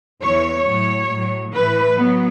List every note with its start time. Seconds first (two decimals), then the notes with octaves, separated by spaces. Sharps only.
0.21 E2 E3 C#5
0.65 A2 F#3 C#5
1.09 A2 F#3
1.53 A2 E3 B4
1.97 F#3 B3